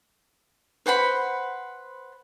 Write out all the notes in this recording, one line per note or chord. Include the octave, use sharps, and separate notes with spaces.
B4 C5 F#5 B5